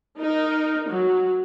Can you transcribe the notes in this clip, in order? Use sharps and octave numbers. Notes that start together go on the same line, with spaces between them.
D#4 A#4
F#3